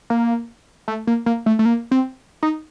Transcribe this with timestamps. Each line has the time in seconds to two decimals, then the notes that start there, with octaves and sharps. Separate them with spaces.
0.10 A#3
0.88 A3
1.07 A#3
1.26 A#3
1.46 A3
1.59 A3
1.65 A#3
1.91 C4
2.43 D#4